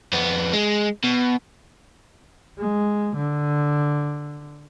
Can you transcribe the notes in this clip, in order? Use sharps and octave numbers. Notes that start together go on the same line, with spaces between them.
F2 B3
G#3
B2
G#3
D3